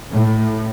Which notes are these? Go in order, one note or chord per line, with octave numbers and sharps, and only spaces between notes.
A2